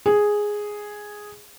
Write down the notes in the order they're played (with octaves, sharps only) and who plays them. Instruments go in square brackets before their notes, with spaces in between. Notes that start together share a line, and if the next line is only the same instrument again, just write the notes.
[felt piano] G#4